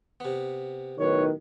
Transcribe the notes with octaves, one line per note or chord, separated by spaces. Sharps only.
C3 B3
B1 A2 D#3 B4 C#5